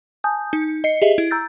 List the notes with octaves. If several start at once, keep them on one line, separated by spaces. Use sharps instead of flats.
G#5 A5 D#6 G6
D#4
D#5 C7 C#7
G4 G#4 D#5 E5
E4
A#5 E6 G6 A6